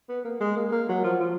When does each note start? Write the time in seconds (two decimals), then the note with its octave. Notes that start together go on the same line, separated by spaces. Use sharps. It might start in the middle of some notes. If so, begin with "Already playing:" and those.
0.09 B3
0.25 A#3
0.41 G#3
0.57 A#3
0.72 A#3
0.89 F#3
1.04 F3
1.20 F3